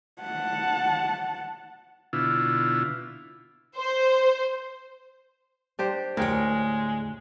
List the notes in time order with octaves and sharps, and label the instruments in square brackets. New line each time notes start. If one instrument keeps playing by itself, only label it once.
[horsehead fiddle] F#5 A5
[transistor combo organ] B2 D3 E4 F4
[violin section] C5
[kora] D4 G4 C5
[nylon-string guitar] D2 C#5 [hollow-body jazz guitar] A2 [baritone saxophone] G#3 [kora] A#4 G5